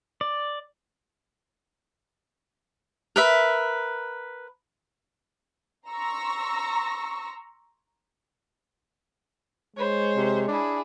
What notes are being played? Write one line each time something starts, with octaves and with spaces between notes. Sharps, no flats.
D5
A#4 B4 E5
A#5 C6 C#6 E6 A#6
G#3 C5 C#5
C3
D4 E4 G#4